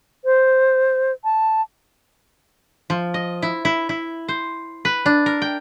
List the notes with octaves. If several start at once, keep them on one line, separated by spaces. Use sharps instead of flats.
C5
A5
F3
D#5
E4
E4
E4
C5
B4
D4
A#4
G5